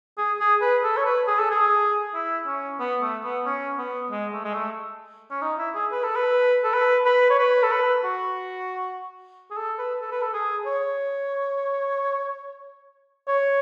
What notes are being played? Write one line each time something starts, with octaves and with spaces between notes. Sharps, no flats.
G#4
G#4
B4
A4
C#5
B4
G#4
A4
G#4
E4
C#4
B3
A3
B3
C#4
B3
G#3
A3
G#3
A3
C#4
D#4
E4
G#4
B4
A4
B4
A4
B4
B4
C#5
B4
A4
B4
F#4
G#4
A4
B4
A4
B4
A4
G#4
C#5
C#5